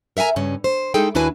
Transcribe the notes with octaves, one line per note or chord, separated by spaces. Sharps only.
A#4 E5 F#5 G#5 A#5
G2 C#3 C#4
C5
G#3 D#4 E4 G#4 A4 G5
D#2 D4 E4 F#4 B4 G#5